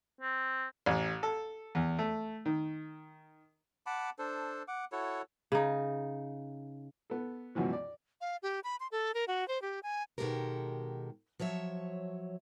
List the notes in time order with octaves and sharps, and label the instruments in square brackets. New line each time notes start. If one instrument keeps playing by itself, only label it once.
[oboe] C4
[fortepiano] A1
A4
E2
A3
D#3
[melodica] F#5 A5 B5 D6
D4 A4 C5
F#5 D6
E4 F#4 A4 C#5
[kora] C#3 D#4
[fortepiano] B3 A4
C#2 F#2 B2 E3 F3
D5
[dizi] F5
G4
B5
C6
A4
A#4
F#4
C5
G4
G#5
[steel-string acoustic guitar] B2 D#3 G#3 G4 A4 A#4
F3 F#3 C#5 E5